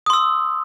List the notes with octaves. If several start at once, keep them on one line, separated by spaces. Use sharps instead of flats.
C6 D#6 E6